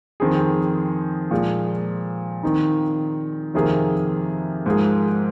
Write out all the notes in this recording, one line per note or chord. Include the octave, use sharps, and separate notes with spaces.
F2 D#3 C4 G#4
A#2 F3 G#3
D#3 C4 D#4
F2 C3 D#3 A#3 G#4
G#2 F3 A#3 G#4